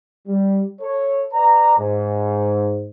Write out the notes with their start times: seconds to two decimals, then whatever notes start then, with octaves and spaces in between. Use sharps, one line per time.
0.28 G3
0.81 A4 C#5
1.33 B4 D5 A#5
1.78 G#2